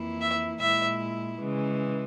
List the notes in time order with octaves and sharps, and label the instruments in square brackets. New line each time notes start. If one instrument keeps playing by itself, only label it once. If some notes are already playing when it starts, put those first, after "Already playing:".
Already playing: [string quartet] F2 E3 A#3 E4
[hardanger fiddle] E5
[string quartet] A#2 G#3 E4 [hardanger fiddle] E5
[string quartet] C#3 E3 G#3